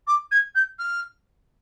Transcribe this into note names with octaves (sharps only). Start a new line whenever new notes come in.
D6
G#6
G6
F6